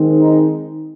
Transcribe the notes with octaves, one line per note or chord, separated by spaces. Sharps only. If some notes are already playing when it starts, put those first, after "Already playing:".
Already playing: D#3 G#3 C4
D#4